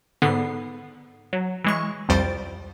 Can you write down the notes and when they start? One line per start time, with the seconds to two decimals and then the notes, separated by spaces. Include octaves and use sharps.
0.22 G#2 D3 B3 C7
1.33 F#3
1.64 E3 G#3 C#6
2.09 C2 F2 G3 C5 A6 D7